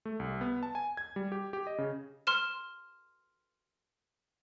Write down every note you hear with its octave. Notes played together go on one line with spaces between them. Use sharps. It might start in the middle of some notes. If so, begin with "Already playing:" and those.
A3
C2
B3
A5
G#5
G#6
G3
G4
G4
D#5
C#3
C6 F6 E7